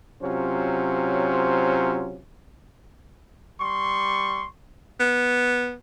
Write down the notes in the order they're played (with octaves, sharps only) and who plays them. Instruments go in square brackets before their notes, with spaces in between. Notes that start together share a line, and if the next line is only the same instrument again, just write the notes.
[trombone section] C3 F#3 C#4 F4 C5
[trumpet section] G3 C6 C#6
[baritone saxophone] B3